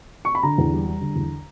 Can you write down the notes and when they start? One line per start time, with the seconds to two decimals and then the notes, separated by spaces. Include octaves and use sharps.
0.25 C#6
0.35 B5
0.43 D3 A#5
0.58 E2
0.73 G3
0.87 G3
1.01 D3
1.16 E2